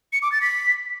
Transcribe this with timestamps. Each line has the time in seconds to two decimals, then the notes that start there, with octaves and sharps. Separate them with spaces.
0.13 C#7
0.22 D6
0.32 A6
0.41 B6